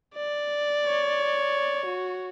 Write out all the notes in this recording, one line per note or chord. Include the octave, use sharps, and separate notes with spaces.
D5
C#5
F#4